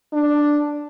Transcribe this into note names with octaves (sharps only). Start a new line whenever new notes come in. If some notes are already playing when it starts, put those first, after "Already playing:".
D4